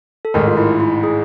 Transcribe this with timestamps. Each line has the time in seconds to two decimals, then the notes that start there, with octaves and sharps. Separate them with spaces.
0.25 A4
0.34 A1 G#2 D#3 A#4
0.48 F4
0.57 E4
0.80 E4
1.03 G#4